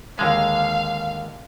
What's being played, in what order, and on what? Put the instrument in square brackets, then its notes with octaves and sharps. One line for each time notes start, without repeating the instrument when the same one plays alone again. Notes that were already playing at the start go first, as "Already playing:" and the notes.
[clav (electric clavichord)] D#2 D3 G#3 [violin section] F5